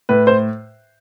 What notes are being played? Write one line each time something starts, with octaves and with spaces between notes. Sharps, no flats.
A2 B4
C5